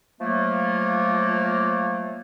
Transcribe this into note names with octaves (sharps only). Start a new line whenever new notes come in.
F3 F#3 A3 A#3